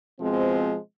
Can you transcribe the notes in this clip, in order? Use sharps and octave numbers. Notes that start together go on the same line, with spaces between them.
B2 F3 G#3 C4